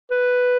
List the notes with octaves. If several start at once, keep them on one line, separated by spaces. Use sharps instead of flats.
B4